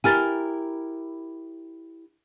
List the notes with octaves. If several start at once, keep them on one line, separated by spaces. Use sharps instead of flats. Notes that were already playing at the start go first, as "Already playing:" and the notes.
E4 G4 A#4 G#5 F6 A6